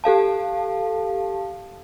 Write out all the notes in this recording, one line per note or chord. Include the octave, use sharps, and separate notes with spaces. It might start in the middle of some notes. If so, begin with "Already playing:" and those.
G4 A4 F5 A5